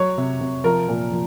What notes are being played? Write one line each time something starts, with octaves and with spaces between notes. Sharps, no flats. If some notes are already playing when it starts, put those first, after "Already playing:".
Already playing: F#3 C#5
C3
C3
F3 A#4
A#2
F3